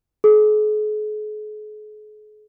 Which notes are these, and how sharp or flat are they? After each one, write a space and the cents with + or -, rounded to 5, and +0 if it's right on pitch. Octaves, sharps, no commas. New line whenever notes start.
G#4 +45